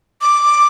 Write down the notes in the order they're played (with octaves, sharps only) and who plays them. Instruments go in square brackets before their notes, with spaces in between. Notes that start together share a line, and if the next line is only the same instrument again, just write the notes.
[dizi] D6